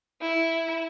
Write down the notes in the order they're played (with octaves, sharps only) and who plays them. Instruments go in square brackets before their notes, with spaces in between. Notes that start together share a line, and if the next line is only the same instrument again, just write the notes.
[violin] E4